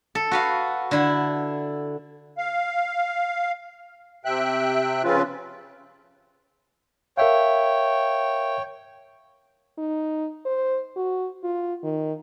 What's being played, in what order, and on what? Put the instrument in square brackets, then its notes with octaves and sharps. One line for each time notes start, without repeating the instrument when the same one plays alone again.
[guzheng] A4
F#4 B4 F5
D3 E4
[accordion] F5
C3 E5 G5 F#6
C#3 F3 C4 C#4 F4 B4
[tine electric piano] A#4 E5 F5 [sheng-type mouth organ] C#5 G5
[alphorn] D#4
C5
F#4
F4
D#3